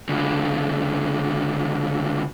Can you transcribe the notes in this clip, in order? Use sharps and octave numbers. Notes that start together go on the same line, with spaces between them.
C#2 D3